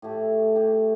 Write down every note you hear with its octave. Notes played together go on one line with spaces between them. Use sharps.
A2 A3 G4
A2 A3 G4